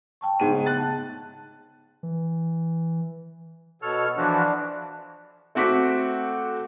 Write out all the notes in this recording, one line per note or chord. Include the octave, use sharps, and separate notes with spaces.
G5 A5 C#6
G#2 C#3 B3 D#7
F#6 A6
A5
E3
B2 A4 C#5 F6
E3 F3 D4 F#4
A3 C4 F#4 D6 B6